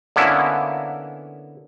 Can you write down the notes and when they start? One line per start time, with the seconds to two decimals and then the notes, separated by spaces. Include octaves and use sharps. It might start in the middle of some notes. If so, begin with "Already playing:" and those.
0.16 D3 A#3 B3 C#4 E4